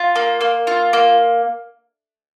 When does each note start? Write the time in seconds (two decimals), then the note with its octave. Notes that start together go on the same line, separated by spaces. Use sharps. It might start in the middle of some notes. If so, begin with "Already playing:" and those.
Already playing: F4
0.16 A#3
0.41 A#3
0.67 F4
0.93 A#3